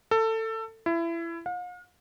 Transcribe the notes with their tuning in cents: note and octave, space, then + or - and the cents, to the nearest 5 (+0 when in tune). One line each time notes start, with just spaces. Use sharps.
A4 +20
E4 +25
F5 +45